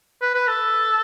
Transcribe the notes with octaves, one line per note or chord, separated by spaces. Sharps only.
B4
B4
A4